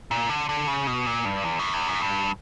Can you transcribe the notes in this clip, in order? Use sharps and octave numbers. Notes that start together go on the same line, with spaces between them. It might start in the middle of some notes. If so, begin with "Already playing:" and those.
A#2
D3
D3
C#3
B2
A#2
G2
E2
F#2
E2
F#2
G2